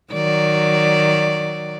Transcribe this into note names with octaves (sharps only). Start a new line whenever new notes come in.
D#3 F#3 D5